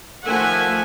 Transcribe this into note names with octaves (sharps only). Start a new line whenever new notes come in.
D#3 F3 A3 E5 F#5 G#5